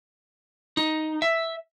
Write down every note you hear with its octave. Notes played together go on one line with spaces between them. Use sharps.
D#4
E5